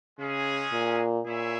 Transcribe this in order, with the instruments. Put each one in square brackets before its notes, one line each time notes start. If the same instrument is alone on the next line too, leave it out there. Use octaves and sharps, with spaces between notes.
[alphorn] C#3 [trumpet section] G#3 C#4 G#4
[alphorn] A#2
[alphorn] A#2 [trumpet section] E4 G#4 C#5 E5